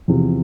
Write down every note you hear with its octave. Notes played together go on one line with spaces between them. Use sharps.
E2 C3 F3